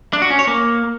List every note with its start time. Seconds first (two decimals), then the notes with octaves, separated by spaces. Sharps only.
0.13 D4
0.22 F#4
0.30 C#4
0.39 C#5
0.47 A#3